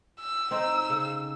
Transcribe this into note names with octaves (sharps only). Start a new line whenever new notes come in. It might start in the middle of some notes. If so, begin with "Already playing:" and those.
E6
C4 D#4
C#3